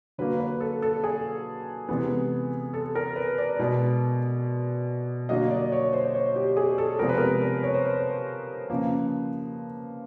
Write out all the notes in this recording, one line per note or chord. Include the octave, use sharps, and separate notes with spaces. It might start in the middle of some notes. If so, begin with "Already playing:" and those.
D3 F#3 A#3 B4
B4
A4
A4
G#4
C3 E3 G#3 B3
A4
A#4
B4
D5
B2 G#3 B3
D3 F#3 A#3 D#5
D5
C#5
C5
C#5
G4
G#4
A4
C3 F3 G#3 B3 A#4
B4
A#4
B4
C#5
C5
B4
C#3 F3 A#3